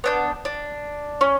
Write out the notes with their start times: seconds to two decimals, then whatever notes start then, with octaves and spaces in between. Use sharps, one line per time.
0.04 B3 D4 G6
0.45 D4
1.21 C#4